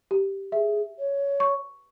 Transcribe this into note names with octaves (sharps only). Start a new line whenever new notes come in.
G4
G#4 E5
C#5
C#6